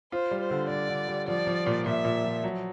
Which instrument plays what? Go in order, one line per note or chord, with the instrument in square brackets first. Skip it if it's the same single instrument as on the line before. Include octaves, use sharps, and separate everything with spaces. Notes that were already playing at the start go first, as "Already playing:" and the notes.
[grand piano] F4 [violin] C5
[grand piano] G3
[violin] C5
[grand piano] D3
[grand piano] G3 [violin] D5
[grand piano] D3
G3
[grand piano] F3 [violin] D5
[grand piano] F3
A#2
[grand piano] A#2 [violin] E5
[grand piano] A#2
F3
F#3